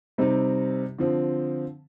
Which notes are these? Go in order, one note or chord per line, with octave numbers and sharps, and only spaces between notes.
C3 G3 C4 D#4
D3 F3 C4